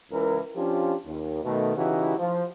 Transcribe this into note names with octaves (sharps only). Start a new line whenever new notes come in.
C#2 E3 A#4
F3 C#4 D4 F4 G4
D#2
B2 D#3 A3
C#3 E3 D#4 E4 F#4 G4
F3